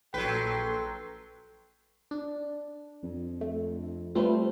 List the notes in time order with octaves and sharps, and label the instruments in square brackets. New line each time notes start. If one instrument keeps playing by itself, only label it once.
[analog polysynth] A#1 C6 [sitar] F#3 B4 [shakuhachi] A4 [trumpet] G5
[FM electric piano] D4
[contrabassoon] F2
[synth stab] A3
[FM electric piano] G3 A3 C4 [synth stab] F4 B4 C5